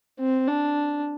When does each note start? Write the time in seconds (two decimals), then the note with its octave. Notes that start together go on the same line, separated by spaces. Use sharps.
0.19 C4
0.48 D4